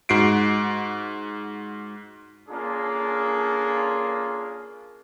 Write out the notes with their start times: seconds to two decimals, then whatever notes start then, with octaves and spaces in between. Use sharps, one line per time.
0.09 G#2 F#4 C7 D7
2.49 A#3 C#4 D4 F4 G#4 A4